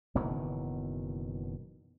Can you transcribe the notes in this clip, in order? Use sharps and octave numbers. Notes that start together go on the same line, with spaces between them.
F#1 B2 D#3 E3